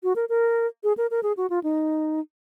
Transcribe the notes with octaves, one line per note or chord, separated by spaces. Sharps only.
F#4
A#4
A#4
G#4
A#4
A#4
G#4
F#4
F4
D#4